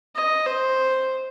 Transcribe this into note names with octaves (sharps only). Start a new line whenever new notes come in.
D#5
C5